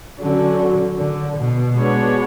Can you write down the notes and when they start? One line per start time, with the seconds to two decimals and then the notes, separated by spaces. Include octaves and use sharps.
0.19 D3 F#3 C#4 F#4 A4
0.97 D3
1.36 B2
1.76 G#3 B3 D4 F#4 C#5